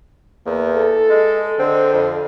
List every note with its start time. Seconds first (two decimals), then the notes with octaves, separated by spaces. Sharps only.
0.46 E2 A#3
0.75 A4
1.10 G#3
1.59 D3 C4
1.93 F2